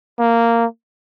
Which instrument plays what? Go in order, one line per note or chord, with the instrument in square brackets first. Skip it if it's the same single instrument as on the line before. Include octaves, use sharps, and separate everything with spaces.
[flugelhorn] A#3